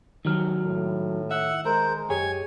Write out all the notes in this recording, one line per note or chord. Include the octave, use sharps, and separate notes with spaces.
G#2 D#3 F#3 F6
A2
E5 F#5
G#3 A#4 C5
F#2 G4 G#4 C#5 G#5